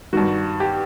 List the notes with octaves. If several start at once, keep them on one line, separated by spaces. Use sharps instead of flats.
G2 D#3 F#4
G4